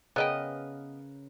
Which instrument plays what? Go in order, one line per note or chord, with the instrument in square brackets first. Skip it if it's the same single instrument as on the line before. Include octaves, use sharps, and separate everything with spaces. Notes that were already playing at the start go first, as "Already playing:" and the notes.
[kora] C#3 A#4 B4 [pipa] B3 D#5 G5